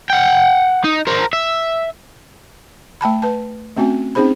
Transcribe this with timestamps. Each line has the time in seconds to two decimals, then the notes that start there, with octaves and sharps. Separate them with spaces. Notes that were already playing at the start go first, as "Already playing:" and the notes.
0.10 F#5 G5
0.84 D#4
1.07 A#4 C5
1.33 E5
3.01 A3 G5 A5 B5
3.22 B4 A5
3.77 A3 C4 C#4 F#4 G#5
4.15 C4 C#4 D#4 G#4 C5 B5